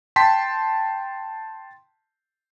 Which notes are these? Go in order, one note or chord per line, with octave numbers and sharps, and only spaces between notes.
G5 A5 C6 B6